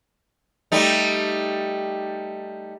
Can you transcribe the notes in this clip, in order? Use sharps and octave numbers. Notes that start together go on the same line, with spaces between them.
G3 A3 D#4